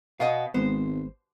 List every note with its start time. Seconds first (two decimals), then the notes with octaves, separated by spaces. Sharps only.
0.20 B2 B3 D#5 F5
0.54 G#1 G#3 B3 C5